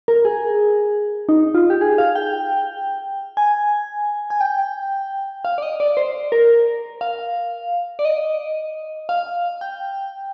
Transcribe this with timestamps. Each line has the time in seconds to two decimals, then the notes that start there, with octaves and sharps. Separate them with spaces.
0.08 A#4
0.25 G#4
1.29 D#4
1.55 F4
1.70 G4
1.81 G#4
1.98 F5
2.15 G5
3.37 G#5
4.30 G#5
4.41 G5
5.45 F5
5.58 D5
5.62 D#5
5.80 D5
5.97 C5
6.32 A#4
7.01 F5
7.99 D5
8.05 D#5
9.09 F5
9.61 G5